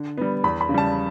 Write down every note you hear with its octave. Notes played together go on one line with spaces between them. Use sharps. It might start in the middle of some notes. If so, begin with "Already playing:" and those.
Already playing: D3
G3 B3
E2 B5
B5
C#3
G3 A5